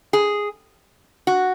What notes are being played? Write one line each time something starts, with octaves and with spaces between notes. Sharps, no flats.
G#4
F#4